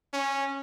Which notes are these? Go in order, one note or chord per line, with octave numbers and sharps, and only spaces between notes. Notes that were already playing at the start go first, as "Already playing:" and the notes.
C#4